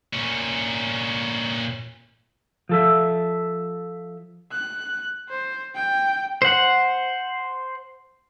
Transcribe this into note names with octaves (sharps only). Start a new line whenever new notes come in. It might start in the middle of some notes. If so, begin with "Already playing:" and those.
A#2 C#4
F3 A4 E5
F#6
C5
G5
C5 F#5